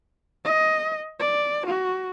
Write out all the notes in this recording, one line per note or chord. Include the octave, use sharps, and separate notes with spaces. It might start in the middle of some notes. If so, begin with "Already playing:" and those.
D#5
D5
F#4